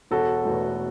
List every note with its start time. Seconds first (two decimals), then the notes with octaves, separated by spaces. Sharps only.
0.11 E1 F#4 A4
0.45 E2 B2 A3